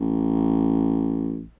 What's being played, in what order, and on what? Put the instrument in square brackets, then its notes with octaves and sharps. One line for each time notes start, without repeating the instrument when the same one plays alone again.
[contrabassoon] A1